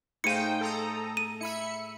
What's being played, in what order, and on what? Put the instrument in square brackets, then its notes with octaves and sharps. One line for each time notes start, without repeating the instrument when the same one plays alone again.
[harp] A2 G#4 F5 [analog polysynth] D#4 C5 G5 [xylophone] C#7 D#7
[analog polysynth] A4 A#5 D#6
[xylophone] D#7
[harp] E4 [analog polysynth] E5 B5 C#7